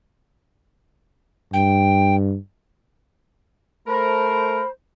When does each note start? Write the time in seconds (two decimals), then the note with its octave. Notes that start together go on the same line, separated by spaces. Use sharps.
1.53 G2 G5
3.87 A3 A#4 C5 B5